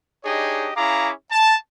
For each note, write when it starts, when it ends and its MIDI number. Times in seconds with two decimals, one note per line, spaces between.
0.25 0.71 62
0.25 0.71 63
0.25 0.71 67
0.25 0.71 68
0.25 0.71 73
0.25 0.71 75
0.76 1.11 61
0.76 1.11 64
0.76 1.11 68
0.76 1.11 77
0.76 1.11 82
0.76 1.11 86
1.31 1.56 81